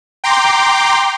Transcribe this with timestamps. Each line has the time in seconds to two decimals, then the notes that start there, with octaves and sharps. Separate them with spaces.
0.24 G5 A#5 C6 D6